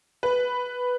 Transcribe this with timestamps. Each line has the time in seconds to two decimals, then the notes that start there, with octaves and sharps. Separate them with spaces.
0.23 B4